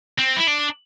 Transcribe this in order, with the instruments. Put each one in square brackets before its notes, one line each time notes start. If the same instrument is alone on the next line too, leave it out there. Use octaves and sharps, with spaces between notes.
[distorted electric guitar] C4
E4
D4